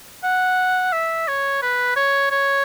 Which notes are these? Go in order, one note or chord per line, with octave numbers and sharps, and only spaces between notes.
F#5
E5
C#5
B4
C#5
C#5